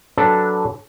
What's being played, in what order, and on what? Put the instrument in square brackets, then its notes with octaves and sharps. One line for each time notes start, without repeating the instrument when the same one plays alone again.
[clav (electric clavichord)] F#3 D4 A4 B4